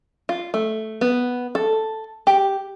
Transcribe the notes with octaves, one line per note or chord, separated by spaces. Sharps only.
F4
A3
B3
A4
G4